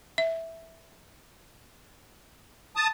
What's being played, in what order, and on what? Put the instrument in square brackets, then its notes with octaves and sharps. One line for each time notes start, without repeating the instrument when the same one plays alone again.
[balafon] E5
[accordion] A5 D#6